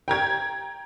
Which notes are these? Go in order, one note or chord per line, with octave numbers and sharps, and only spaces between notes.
G5 A#5 G#6